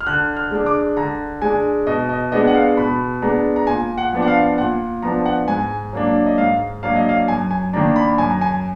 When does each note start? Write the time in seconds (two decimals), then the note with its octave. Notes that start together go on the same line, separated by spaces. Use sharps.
0.01 F6
0.07 D3 F#6
0.37 F6
0.51 G#3 D4
0.66 D6
0.97 D3 A#5
1.42 G#3 D4 G#5
1.87 B2 D#5
2.09 D#5
2.32 G#3 B3 D4 D#5
2.47 F#5
2.55 F5
2.77 B2 B5
3.22 G#3 B3 D4 A#5
3.56 A#5
3.67 A#2 G#5
3.98 F#5
4.13 F3 B3 D4
4.22 F#5
4.28 F5
4.58 A#2 F#5
5.02 F3 B3 D4 A#5
5.26 F#5
5.48 G#2 G#5
5.93 F#3 A#3 D4
6.26 D#5
6.38 G#2 F5
6.83 F#3 A#3 D4 F5
6.96 D#5
7.09 F5
7.28 F#2 G#5
7.51 G#5
7.73 D#3 A#3 D4 A#5
7.96 B5
8.18 F#2 G#5
8.30 A#5
8.41 G#5